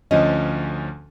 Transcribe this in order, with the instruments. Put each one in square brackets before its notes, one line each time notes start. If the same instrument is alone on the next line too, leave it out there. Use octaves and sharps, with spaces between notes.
[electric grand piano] D2 F3 C#4 [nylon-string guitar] D#5